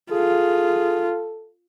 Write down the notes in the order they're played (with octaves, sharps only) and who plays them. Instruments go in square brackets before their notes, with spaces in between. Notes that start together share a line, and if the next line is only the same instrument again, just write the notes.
[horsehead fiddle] F4 [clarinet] G#4 [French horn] A4